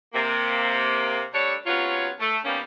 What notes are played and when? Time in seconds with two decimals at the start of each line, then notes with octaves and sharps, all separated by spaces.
0.14 C3 A#3
1.33 G3 A3 D4 A4 C#5
1.66 C3 F#3 B3 C#4 F4 C#5
2.20 A3
2.45 D#3 G3 A#3 B3 C#4